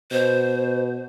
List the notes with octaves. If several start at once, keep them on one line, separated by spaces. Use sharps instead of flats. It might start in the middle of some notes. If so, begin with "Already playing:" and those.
B2 C5